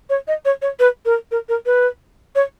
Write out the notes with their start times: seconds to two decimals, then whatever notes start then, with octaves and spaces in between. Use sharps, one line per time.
0.10 C#5
0.28 D#5
0.45 C#5
0.62 C#5
0.79 B4
1.05 A#4
1.31 A#4
1.49 A#4
1.66 B4
2.35 C#5